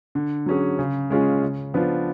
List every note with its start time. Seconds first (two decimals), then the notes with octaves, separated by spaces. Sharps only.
0.15 D3
0.46 F#3 C#4 G#4
0.79 C#3
1.10 G#3 C#4 F4 G#4
1.42 C#3
1.74 F3 B3 D4 F4